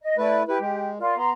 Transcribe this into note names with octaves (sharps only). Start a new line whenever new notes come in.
D#5
A3 E4 B4 D5
E4 G4 B4
G#3
F4 A#4 D5
B3 A#5 C6